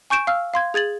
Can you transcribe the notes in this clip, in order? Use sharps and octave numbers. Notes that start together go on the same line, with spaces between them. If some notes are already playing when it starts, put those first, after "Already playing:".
G#5 C#6 G6 D7 E7
F5 E6 F6
F5 C6 G#6
G#4 G#6 A6 F#7